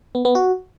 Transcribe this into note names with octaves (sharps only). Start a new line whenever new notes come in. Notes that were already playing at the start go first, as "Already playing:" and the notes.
B3
B3
F#4